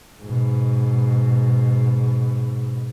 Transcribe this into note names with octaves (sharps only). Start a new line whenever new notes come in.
G#2 B2